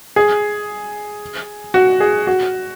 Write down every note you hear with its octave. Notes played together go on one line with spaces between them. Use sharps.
G#4
F#4
G#4
F#4